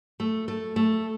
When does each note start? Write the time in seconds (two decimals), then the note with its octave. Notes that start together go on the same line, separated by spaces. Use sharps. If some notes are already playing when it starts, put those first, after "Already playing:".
0.20 A3
0.48 A3
0.76 A3